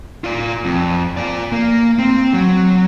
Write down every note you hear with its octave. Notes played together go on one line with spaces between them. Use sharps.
F4 D5
F2
F4 D5
A#3
C4
F#3